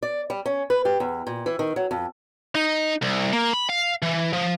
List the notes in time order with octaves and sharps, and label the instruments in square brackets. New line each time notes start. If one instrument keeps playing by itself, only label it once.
[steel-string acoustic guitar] D5
G3
C#4
B4
G4
E2
A#2
E3
D#3
F#3
F2
[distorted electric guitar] D#4
C2
A#3
B5
F5
E3
F3